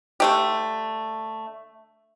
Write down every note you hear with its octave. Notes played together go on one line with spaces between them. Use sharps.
D3 A3 G4